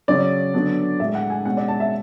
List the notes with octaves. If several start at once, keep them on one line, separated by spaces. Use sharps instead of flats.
C#3 F#3 C#4 D5
D3 F#3 B3 D4
A2 G#3 D4 E5
F#5
G#5
B2 G#3 C#4 F#5
D5
A5
E5